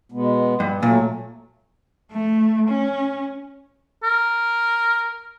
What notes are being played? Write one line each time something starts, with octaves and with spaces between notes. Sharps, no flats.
B2 G#3 B3
G2
A#2 F#3 A3
A3
C#4
A#4